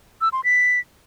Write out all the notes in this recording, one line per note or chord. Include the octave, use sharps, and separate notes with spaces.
E6
C6
B6